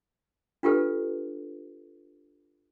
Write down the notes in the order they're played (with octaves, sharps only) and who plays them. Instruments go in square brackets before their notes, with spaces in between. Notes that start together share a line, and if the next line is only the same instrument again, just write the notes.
[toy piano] D4 F4 G4 A4 B4